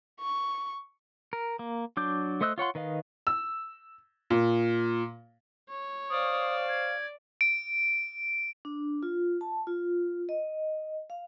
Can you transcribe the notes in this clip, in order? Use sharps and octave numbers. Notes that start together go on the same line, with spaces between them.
C#6
A#4
A#3
F#3 D4 D6 G6
A3 C5 D#5 E6 F#6
F4 C#5 F#5 C6
D#3 B4 D#5 F5
E6
A#2
C#5
C5 D5 F5 D#6
G#6
D7
D4
F4
A5
F4
D#5
F5